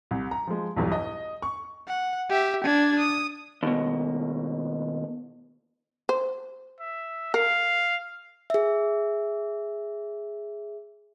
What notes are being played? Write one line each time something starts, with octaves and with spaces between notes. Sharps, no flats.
C2
A#5
F3 G#3
B1 E2 G2
D#5
C#6
F#5
G4 E5
D4 G#6
D#6
D#2 B2
C5
E5
A#4 F5
G#4 E5